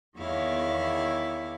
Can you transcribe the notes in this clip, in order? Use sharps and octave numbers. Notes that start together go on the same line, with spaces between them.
E2 D#3 E4 C#5 F5 D6